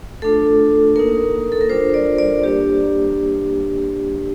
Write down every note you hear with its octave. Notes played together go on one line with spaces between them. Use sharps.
A3 D4 F4 A4
A#3 D#4 A#4
A4
A#4
G3 D4 F4 C5
D5
D5
G3 A#3 D4 G4